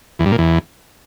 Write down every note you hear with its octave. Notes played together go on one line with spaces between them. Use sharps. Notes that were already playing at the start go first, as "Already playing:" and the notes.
E2
G2
A#2
E2